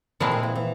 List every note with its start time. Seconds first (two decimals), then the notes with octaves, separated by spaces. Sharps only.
0.20 A#2 D3 F3 G#3 C4 E4
0.31 D#3
0.43 E3
0.55 E3